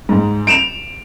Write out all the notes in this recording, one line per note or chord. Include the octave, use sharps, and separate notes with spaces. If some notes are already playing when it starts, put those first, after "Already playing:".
G#2
D7 E7 F7